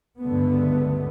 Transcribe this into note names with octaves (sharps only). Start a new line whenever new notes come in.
C#2 G2 D3 A3 B3